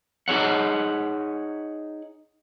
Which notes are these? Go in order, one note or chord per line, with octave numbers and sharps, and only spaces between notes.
D#4 G#4 C#5 F#5